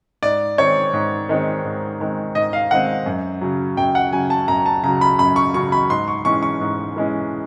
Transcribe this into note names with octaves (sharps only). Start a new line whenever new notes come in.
G#2 D5
D#3 G#3 C4 C#5
G#2
D#3 G#3 C4
G#2
D#3 G#3 C4
G#2 D#5
F5
D#3 G#3 C4 F#5
F#2
C#3 F#3
F#2 G5
F#5
C#3 F#3 G#5
A5
F#2 A#5
A5
C#3 F#3 A#5
B5
F#2 B5
C#6
C#3 F#3 C#6
B5
G#2 C6
C#6
E3 G#3 C#4 C#6
C#6
G#2
E3 G#3 C#4